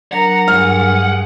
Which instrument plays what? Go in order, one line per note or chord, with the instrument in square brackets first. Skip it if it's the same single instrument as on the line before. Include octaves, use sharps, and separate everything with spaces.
[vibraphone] F#3 D4 A#4 [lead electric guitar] F#5 [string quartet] A#5
[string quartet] G2 G#4 [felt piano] F6